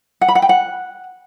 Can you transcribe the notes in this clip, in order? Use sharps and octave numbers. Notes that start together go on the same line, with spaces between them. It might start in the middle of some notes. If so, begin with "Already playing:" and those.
F#5
B5
F#5
G5
F#5